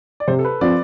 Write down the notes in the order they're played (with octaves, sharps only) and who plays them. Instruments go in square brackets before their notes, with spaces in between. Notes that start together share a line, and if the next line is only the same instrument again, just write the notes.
[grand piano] D5
[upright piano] C3 [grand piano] C5
[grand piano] A4
B4
[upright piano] F3 C4 F4 [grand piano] D5